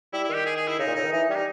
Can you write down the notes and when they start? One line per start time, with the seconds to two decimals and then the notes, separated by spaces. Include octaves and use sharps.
0.13 G3 E4
0.24 D#3 E4
0.34 G4
0.46 G#4
0.56 G#4
0.67 E4
0.79 C#3 D#4
0.87 A#2
0.95 C#3 D#4
1.04 D#3
1.12 E3 D#4
1.29 G3 C#4
1.35 D#4